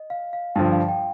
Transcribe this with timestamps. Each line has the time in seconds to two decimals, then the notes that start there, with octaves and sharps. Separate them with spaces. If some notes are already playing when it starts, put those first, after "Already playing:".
Already playing: D#5
0.10 F5
0.33 F5
0.55 G2 D3 F3 G5
0.72 F5
0.89 G5